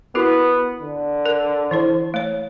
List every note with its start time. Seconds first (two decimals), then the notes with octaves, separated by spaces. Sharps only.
0.15 B3 E4 F#4 A#4
0.81 D3
1.26 A#4
1.71 E3 E4 C5
2.14 A3 C#5